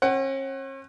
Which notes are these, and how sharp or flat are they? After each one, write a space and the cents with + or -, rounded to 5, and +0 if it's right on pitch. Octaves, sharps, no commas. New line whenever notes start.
C#4 -45 F#5 +25